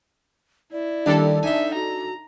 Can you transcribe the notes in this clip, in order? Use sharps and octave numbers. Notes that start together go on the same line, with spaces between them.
E4 D5
D#2 D#3 G3 D4 A4
D#4 E5 G#5 C6
F#4 A#5